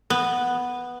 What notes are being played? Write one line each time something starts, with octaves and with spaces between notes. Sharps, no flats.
B3